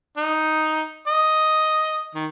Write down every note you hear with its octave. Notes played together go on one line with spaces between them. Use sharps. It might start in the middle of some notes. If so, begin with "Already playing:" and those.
D#4
D#5
D#3